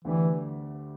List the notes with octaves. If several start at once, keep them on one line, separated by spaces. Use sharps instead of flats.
D2 D3 E3 A3 D4 G4